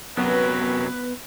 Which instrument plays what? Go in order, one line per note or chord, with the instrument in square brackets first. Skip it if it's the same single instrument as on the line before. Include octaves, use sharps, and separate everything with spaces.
[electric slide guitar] F#2 C3 F#3 [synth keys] B3 [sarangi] B4